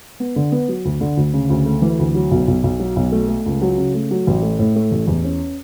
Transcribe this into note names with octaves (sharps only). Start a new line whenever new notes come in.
B3
D3
B3
F#3
D2
D3
D2
C#3
D2
A3
E3
D2
F#3
B1
B1
B1
F#3
B1
A3
A3
C#2
F#3
C#3
A3
F#3
A1
A3
A2
A3
A1
E2
C#4